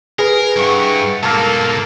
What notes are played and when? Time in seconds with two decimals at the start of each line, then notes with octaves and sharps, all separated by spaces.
0.19 G#4 A#4 B4
0.56 G2 E4 F#5 C#6
1.23 G#2 B2 A#3 A4 A5 F6